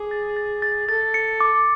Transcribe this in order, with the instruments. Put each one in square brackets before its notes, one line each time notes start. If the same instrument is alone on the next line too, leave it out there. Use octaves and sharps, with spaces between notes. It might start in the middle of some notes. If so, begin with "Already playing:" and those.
Already playing: [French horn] G#4 [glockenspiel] D6
[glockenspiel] A6
A6
A6
[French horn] A4 [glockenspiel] A6
[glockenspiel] C#7
D6